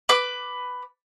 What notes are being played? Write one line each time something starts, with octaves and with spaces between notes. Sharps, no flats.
B4 D6